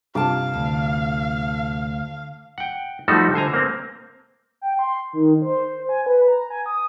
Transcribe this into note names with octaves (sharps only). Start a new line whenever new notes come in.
G2 C3 F4 F5 A5 D6
D2
F#5 G5
F3 G3 A3 D#4 F#4 A4
D3 C5 G#5 A#5
A#3 C4
G5
C6
D#3
C5
G#5
B4
A#5
G#5
D#6